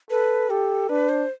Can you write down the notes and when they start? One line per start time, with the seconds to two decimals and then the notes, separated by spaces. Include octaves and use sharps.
0.10 A4 B4
0.49 G4 A4
0.89 D4 B4
1.09 C5